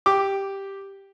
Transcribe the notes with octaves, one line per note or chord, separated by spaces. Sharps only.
G4 D6